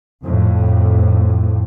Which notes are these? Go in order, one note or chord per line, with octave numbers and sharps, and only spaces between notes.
F2 A2